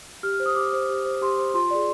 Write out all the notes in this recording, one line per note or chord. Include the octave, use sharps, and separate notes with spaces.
G4 F6
F6
C5
D#6
G4 D6
C5
G4
C5
G4 C6
C5
F4 C6
G#4 D5